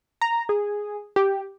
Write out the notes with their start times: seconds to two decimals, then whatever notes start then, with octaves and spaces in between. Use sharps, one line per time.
0.21 A#5
0.49 G#4
1.16 G4